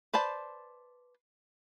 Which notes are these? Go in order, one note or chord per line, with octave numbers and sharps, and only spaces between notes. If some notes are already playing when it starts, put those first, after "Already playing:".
B4 C5 D5 A5